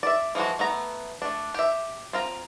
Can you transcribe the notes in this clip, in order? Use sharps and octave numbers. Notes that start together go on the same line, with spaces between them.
D5 E5
E3 F3 G#3 F#4
A3 B3 A#5
A3 D4
G4 E5
C4 F4 A#5